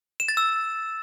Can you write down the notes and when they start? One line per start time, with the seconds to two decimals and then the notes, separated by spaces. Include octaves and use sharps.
0.20 E7
0.28 A6
0.37 E6